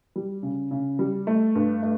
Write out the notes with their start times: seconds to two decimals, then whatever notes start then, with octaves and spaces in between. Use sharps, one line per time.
0.16 G3
0.43 C#3
0.71 C#3
0.99 G3
1.27 A3
1.55 G2
1.82 A3